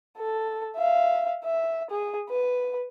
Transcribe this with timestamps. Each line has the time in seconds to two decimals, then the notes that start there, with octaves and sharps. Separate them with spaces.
0.18 A4
0.76 E5 F5
1.45 E5
1.91 G#4
2.30 B4